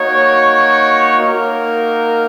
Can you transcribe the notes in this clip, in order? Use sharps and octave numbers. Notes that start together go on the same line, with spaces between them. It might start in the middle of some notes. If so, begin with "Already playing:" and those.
Already playing: A#3 D#4 F#4 C#5
A#3 D#4 F#4 A#4